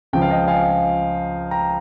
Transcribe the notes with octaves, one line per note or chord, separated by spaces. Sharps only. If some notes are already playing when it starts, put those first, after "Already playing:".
C#2 C#3 F3 G5
F5
D#5 G5
F5 G#5
G5 A#5